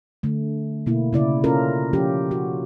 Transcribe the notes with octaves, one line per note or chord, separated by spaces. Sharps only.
D3 A3
B2 A#3 E4
C#3 E4 D5
C#4 F4 A4 A#4
F3 C#4 F4 G4
F#4